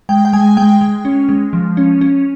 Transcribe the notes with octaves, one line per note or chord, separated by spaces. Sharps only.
G#3 G5
G5
G#3 G#5
G#3 G5
G#3
C#4
G#3
F3
C#4
C#4